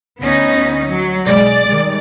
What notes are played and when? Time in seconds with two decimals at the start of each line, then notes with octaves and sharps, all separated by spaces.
0.20 D2 B3 C#4 D#4
0.89 F#3
1.25 B1 G#3 D5
1.67 D#3 G3 G#3